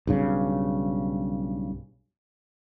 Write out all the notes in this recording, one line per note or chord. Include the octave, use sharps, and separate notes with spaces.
B1 G2 C#3